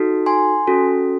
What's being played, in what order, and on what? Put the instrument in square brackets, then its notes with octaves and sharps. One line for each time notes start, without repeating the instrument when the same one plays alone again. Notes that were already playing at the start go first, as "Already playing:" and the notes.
Already playing: [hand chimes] D#4 F#4 A4
G#5 C6
C#4 F#4 A4